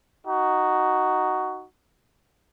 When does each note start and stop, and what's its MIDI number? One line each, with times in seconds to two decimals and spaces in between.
0.24 1.64 63
0.24 1.64 66